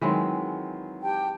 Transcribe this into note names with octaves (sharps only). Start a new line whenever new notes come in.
D#3 E3 F#3 G#3 C4
G4 G5 A5